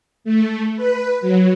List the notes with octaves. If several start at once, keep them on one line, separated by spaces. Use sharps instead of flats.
A3
B4
F#3